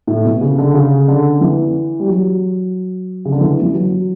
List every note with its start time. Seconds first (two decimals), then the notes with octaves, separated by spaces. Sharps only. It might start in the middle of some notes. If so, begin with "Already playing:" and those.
0.07 A2
0.25 B2
0.41 C#3
0.58 D3
0.74 C#3
1.08 D3
1.41 E3
2.00 G3
2.08 F#3
3.25 C#3
3.32 D3
3.41 E3
3.62 E3
3.74 F#3